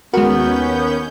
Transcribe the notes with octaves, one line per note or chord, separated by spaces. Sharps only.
D#2 G#3 B3 C#4 F#4 A#4 G6